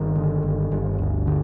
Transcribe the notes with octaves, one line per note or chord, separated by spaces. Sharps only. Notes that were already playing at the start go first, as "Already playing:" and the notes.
Already playing: G1 D#3
D3
G1
G1
D2
D3